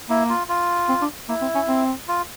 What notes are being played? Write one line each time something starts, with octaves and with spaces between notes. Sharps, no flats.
A#3 E4
F4
F4
C4
D4
A#3 E4
C4
C#4
C4
F4